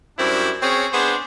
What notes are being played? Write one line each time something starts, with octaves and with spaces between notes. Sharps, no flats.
F#2 G3 C4 D4 E4
C4 C#4 G#4 C#5
B3 D4 G#4 C5